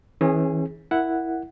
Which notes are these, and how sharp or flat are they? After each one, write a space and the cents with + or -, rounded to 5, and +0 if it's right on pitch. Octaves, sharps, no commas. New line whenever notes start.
E3 -35 C#4 -40 G#4 +0
E4 +0 A#4 +0 F#5 +0